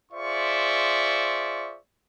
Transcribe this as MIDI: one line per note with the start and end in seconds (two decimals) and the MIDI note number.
0.12 1.77 65
0.12 1.77 68
0.12 1.77 72
0.12 1.77 74
0.12 1.77 76
0.12 1.77 85